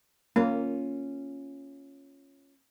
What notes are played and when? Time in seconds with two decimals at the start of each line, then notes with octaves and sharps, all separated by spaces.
0.36 A#3 C#4 F4